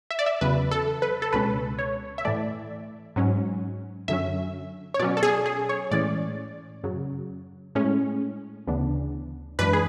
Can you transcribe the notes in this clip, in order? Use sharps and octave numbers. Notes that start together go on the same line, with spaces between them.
E5
D5
E5
E2 C#3 F#3 B4
A4
B4
A4
C#2 B2 G#3 C#4 B4
C#5
E5
A2 E3 A3 D5
G#2 F#3 C#4
F#2 D3 F#3 C#4 E5
C#5
B2 F#3 C#4 D5
A4
G#4
G#4
C#5
A2 E3 G#3 C#4 D5
F#2 C#3 F#3
A2 G#3 C#4
D2 C#3 E3 B3 D4
F#2 E3 G#3 D4 B4
G#4